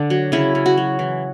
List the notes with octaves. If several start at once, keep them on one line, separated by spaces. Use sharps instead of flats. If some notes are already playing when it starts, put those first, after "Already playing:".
Already playing: D3 D4
F#3
C#3 E4
C#3
F#4
F#3
E3